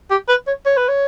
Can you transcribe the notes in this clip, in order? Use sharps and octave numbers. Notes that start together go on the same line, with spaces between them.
G4
B4
C#5
C#5
B4
C#5